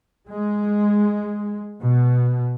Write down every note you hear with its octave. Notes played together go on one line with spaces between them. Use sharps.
G#3
B2